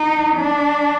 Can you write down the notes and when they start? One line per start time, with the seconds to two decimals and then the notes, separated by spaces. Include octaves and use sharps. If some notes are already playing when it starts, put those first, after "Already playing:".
Already playing: D#4
0.36 D4